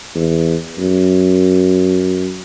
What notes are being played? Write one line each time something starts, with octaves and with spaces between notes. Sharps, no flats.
E2
F#2